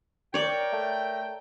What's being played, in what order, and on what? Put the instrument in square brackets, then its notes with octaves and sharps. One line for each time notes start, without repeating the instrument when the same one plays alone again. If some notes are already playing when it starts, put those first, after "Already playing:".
[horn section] A#4 G5 [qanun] C#5 D5
[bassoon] A3